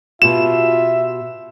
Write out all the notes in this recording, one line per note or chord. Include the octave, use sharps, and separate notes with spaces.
B2 F4 G4 E5 E7